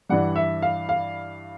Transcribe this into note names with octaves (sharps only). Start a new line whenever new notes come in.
G2 E3 G3 F#5
E5
F5
F5